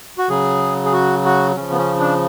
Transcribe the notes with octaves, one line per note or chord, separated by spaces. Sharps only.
F#4
C#3 F#3 G#4
G#4
F#4
F#4
C#3 F3 C#4
B3
C#4
D4